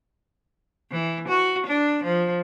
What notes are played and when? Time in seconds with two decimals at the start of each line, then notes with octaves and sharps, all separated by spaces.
0.92 E3
1.28 F#4
1.67 D4
2.04 F3